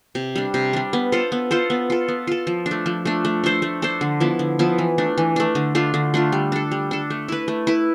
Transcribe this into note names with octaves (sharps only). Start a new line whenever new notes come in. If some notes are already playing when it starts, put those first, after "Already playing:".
C3
G3 D4
C3
G3 D4
B3
F4 A4 C5
B3
F4 A4 C5
B3
F4 A4
B3
F4 A4
F3
D4
A3
F3
A3 D4
A3
D4 A4 C5
A3
D4 A4 C5
D3
F3 B3 E4
D3
F3 B3 E4
E3
A3 D4
E3
A3 D4
D3
A3 D4 F4
D3
A3 D4 F4
G3
D4 A4
G3
D4 A4
A3
E4 B4
A3
E4 B4